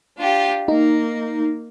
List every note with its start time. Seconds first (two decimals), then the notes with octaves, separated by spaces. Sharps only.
0.17 D4 F4 G4
0.68 A#3 D#4